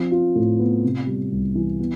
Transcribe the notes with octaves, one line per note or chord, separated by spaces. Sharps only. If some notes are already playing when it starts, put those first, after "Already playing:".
Already playing: F3 C4
F4
A2
B3
C3
G3
C2
E3
B3